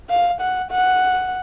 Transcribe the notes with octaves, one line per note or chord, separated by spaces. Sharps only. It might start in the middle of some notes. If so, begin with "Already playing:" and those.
F5
F#5
F#5